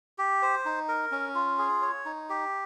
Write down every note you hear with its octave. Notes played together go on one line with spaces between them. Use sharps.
G4
C5
D#4
A#4
C#4
F4
G#4
C#5
D#4
G4